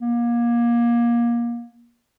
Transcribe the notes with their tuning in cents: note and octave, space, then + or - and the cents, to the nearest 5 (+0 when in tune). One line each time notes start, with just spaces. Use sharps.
A#3 +25